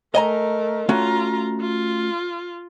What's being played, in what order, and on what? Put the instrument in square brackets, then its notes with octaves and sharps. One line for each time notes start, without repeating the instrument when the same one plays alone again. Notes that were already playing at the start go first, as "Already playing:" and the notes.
[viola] A3 A#4 [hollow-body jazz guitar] D#5 G#5 A#5
[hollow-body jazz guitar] A3 C#4 F#4 [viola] F4 A#5
[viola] F4